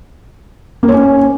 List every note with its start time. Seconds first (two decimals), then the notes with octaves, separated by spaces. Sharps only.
0.83 A#3
0.88 C#5
0.94 C#4